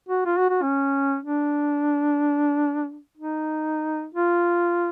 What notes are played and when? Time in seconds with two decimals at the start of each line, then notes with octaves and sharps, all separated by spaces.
0.09 F#4
0.26 F4
0.38 F#4
0.50 F#4
0.63 C#4
1.23 D4
3.18 D#4
4.15 F4